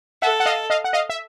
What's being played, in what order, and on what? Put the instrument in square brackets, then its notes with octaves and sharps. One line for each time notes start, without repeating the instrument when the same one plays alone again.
[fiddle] A4 [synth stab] E5 F#5
[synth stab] F#5
D#5 F5
D#5 F5
F#5
D#5 F5
E5